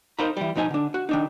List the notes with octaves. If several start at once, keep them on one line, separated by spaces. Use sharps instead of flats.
D#4 A#4 C5 F5 A#5 B5
E3 G3
B1 F3 D#4 E5 G#5
D3 D4
F#4
D#3 D4 D#4